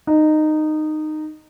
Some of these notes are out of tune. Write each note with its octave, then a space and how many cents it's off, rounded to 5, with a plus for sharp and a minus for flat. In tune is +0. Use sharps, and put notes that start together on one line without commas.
D#4 -15